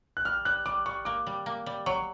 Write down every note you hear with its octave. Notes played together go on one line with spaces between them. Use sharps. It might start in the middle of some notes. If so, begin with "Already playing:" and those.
F#6
G3 F6
G3 F#6
G3 D6
G3 C#6
A#3 D6
G3
A#3
G3
F#3 C#6